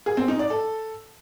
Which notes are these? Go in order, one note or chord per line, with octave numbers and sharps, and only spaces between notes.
G#4
C4
D#4
D5
A4